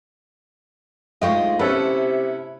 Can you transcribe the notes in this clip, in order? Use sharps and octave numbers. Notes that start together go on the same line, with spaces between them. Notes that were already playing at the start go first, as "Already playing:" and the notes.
D2 G#3 D#4 F4 D#5 G5 C#6
C3 C#4 E4 A4 B4